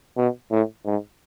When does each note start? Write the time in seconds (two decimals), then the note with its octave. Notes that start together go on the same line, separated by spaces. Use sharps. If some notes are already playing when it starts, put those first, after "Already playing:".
0.17 B2
0.51 A2
0.86 G#2